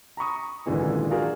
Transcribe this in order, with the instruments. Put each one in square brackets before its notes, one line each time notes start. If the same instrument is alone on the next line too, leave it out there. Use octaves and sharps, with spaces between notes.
[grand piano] A#5 B5 C#6 D#6
G#1 F#2 A#2 D3 E3 G#3
F4 F#4 G#4 A#4 D5 F5